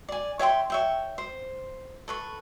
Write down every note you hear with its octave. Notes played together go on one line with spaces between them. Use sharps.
D5 G#5
C#5 E5 G5 C6
C#5 E5 G5
C5
A4 B4 C#6